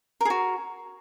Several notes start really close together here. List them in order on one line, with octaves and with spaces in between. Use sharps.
A#4 G#4 F#4